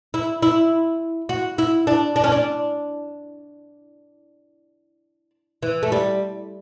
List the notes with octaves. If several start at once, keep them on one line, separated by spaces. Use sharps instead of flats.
E4
E4
F#4
E4
D4
D4
C#4
D4
E3
A3
G3